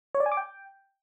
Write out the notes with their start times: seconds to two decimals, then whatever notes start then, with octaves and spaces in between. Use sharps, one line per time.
0.15 C#5
0.20 D5
0.26 G#5
0.32 D6
0.37 G5